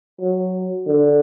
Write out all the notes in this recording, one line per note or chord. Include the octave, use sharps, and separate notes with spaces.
F#3
D3